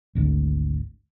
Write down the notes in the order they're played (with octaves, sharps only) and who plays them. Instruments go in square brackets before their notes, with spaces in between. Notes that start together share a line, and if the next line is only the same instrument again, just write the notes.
[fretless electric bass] G#1 D2 G#2